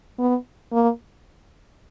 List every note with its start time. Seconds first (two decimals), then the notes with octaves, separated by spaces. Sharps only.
0.19 B3
0.73 A#3